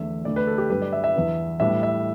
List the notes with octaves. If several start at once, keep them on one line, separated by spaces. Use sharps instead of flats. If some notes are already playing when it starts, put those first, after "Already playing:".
Already playing: E2 D3 A3 D4 E5
D2 D3 A3 D4 D5
B4
A4
G4
G2 D3 G3 B4
D5
E5
E5
E2 E3 B3 D4
A2 G3 B3 D4 E5
E5